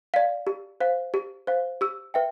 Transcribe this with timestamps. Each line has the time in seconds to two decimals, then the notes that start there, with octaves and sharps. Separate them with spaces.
0.14 D5 F5
0.47 G4
0.81 C5 F5
1.14 G4
1.47 C5 F5
1.81 G4 E6
2.14 B4 E5 G5